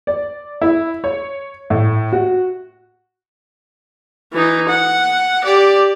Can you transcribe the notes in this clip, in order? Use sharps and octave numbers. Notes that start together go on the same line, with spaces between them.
D5
E4
C#5
A2
F#4
E3 D#4
F#5
G4 D5